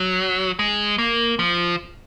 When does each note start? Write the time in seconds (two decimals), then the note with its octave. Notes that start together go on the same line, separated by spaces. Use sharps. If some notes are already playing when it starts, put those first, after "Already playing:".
Already playing: F#3
0.59 G#3
0.98 A#3
1.39 F3